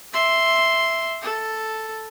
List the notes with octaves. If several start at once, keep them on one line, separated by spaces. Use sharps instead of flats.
E5 C6
A4